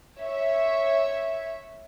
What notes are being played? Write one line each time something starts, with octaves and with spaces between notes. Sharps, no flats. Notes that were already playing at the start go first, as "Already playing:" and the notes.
C#5 E5